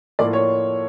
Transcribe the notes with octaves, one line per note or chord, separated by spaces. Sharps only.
A2 F3 A#3 D5
C#5